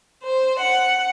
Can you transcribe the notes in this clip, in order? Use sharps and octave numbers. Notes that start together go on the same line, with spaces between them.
C5
F#5